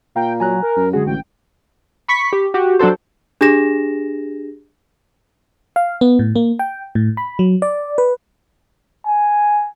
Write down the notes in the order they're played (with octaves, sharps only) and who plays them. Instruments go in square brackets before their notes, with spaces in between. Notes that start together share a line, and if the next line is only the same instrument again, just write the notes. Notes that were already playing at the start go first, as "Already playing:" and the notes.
[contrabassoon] A#2 [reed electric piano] F5 A#5 [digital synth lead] G5
[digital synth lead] F#3 [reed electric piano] G#5 A#5 F#6
[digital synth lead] A#4
[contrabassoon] F#2
[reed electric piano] D3 G#3 F#4 [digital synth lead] G#4
[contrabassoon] A1 [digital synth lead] G5
[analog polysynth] B5 C#6 B6
G4
F#4 G4
F#3 D4 F#4 A4 C5
[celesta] D4 G4 G#4 A#6 E7
[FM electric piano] F5
B3
A2
A#3
G5
A2
B5
F#3
D5
B4
[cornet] G#5